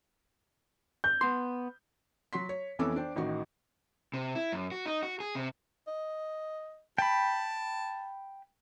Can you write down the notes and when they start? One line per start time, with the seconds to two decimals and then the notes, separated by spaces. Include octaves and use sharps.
1.04 G6
1.21 B3 C6
2.33 F#3 F#4 C6 B6
2.49 C#5
2.79 F2 E3 B3 C#4 A4 D6
2.96 D4 C5 G5
3.16 A1 D#3 F#4 D#5
4.14 C3
4.35 E4
4.52 F#2
4.72 F#4
4.86 D#4
5.03 F#4
5.20 G#4
5.35 C3
5.88 D#5
6.98 G5 A5 B5